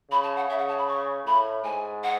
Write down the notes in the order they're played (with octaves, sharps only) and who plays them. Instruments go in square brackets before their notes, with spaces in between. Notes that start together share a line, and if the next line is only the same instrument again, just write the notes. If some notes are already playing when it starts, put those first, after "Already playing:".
[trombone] C#3 [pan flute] B5
[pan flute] A5
F#5
[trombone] C#3 [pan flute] E5
[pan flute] F#5
A5
B5
C#6
[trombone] A2 [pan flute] B5
[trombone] G#2 [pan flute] G#5
[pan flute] F#5